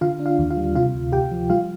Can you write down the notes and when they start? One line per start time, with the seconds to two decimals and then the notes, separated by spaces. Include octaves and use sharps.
0.01 D3 F4 F5
0.19 D4
0.26 F4 F5
0.39 D#2
0.50 F4 F5
0.57 G3
0.75 C3 F4 F5
0.94 D2
1.12 D2 G4 G5
1.32 F3
1.50 G3 F4 F5